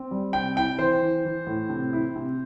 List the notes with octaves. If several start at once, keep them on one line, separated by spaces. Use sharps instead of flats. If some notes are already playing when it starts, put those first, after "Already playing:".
Already playing: C4
G3
C3 G5
E4 G5
E3 C5
E3
E3
A2
C3
E4
C3